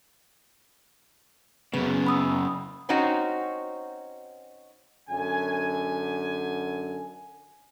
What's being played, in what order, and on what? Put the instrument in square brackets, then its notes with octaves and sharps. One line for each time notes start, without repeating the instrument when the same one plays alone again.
[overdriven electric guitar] F#2 C#3 [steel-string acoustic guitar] B3
[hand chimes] B5 D#6 E6
[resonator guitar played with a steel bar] C4 C#4 D#4 F#4
[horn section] F#2 D3 G#5